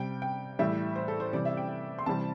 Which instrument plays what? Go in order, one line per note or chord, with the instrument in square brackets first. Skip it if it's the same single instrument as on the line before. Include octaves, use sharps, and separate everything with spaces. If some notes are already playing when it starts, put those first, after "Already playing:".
Already playing: [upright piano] C3 G3 G5
G5
A2 E3 G3 E5
C5
A4
C5
C3 E3 G3 D5
E5
G5
C6
C3 E3 G3 A5